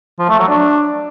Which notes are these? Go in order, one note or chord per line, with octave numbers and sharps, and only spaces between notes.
F3
A3
F#3
D4